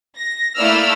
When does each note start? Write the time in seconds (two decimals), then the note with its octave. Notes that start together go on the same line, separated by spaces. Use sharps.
0.15 A#6
0.57 A3 A#3 E4 D5 E6 F6